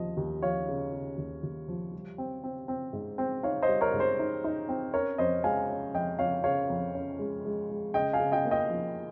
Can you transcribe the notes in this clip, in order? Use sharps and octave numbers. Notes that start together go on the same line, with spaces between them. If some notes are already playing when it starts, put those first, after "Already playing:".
Already playing: D#2 F3 D#5
D#2
F3 C#5 F5
C#3
C#3
D#2
D#2
F3
G3
C4
C4
C4
G#2
C4
D#4 C#5 F5
C5 D#5
G3
A#4 C#5
G#2
C5
D#4
D#4
C4
C#4 A#4 C#5
F2 C5 D#5
G#3 F5 G#5
C#4
F2 D#5 G5
F2 C#5 F5
C#3 C#5 F5
F2
C#4
G#3
G#3
G#3
C#3 D#5 G5
F5 G#5
C#3
D#5 G5
A#3
D#5 G5
F3